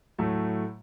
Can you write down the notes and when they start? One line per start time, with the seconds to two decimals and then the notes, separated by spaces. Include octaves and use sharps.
0.18 A2 F#3 A3